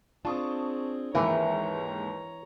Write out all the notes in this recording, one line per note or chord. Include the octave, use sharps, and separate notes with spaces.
C4 D4 F4 G#4 A5 C#6 D#6
D#2 G#2 E3 A#4 B4 C#5 A#5 C#7